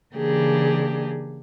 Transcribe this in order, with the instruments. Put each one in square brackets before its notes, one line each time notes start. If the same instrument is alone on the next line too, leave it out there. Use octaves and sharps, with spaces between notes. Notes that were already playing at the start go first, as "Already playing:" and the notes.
[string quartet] C#3 E3 A#3 D4 G4 G#4